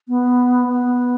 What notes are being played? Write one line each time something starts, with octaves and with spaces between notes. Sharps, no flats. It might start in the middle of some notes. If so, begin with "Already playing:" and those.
B3
B3